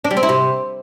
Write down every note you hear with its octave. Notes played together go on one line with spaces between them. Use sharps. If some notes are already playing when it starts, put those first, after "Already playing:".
D4
G3
C4
E4
C3